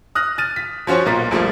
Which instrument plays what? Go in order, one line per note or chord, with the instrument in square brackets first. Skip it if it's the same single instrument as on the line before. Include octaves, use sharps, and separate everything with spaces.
[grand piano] D#6 F6 F#6 A#6
F6 A6 D#7
B6
F3 C#4 F#4 C5 C#5
B1 A#2 A#4 A6 B6
A#1 F3 G3 A3 A#3